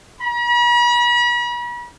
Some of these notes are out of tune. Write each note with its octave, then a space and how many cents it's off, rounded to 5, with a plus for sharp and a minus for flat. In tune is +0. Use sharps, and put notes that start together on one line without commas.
B5 -45